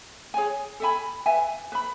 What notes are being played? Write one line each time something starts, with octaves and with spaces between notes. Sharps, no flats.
G#4 C#5 G#5
A4 E5 G#5 B5
B4 E5 G#5
B4 E5 B5